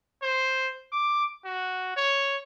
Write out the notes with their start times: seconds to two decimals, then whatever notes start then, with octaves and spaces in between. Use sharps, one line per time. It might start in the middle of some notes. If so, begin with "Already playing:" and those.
0.22 C5
0.92 D6
1.45 F#4
1.97 C#5